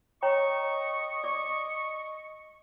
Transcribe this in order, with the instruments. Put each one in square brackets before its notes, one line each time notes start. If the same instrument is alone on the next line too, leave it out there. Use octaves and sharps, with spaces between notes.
[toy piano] C#5 G5 A#5 [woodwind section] D#5 C#6
[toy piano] D5 D6